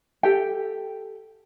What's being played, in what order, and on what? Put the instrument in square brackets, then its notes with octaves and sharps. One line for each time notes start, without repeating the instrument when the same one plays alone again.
[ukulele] G4 A4 G5